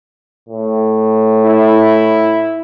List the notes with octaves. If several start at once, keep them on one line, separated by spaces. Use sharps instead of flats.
A2
E4